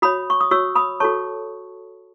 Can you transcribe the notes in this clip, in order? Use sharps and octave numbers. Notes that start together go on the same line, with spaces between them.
F#4 C#5 B5 D#6
C#6
D#6
F#4 C#5 C#6 E6
B5 D#6
F#4 A4 C#5 A5 C#6